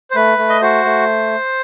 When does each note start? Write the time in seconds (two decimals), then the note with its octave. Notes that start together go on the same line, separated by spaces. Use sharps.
0.11 C5
0.15 A3 B4
0.38 A3
0.49 D#5
0.61 F#4 C5
0.85 A3